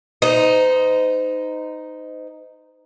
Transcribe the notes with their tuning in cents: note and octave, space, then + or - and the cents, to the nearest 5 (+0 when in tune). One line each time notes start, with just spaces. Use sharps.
D#4 +0 C5 -35